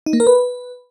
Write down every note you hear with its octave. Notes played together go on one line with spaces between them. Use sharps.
D#4
A#3
A#4
B4